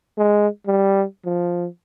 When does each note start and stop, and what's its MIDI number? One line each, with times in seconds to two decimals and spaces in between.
0.18 0.48 56
0.67 1.04 55
1.25 1.67 53